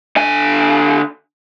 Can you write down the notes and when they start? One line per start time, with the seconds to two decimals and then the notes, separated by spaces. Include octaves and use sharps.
0.17 D3 G#5